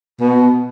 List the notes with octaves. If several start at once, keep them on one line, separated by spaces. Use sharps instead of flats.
B2